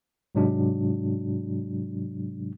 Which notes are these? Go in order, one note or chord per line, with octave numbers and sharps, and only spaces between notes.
G#2 C3 F#3 G#3 D4 F#4